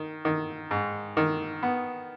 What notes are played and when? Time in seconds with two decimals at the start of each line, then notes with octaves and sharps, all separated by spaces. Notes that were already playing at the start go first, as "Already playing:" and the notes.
Already playing: D#3
0.25 D#3
0.71 G#2
1.17 D#3
1.63 B3